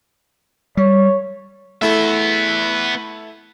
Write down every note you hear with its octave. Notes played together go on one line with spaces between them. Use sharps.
G3 C#5
A3 B3 E4 A4 E5